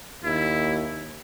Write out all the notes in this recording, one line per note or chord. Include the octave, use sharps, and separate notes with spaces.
D#2 E4